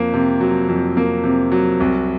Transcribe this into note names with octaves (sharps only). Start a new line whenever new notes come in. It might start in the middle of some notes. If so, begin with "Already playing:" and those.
Already playing: F2 A#3
C3
F#3
F2
A#3
C3
F#3
C2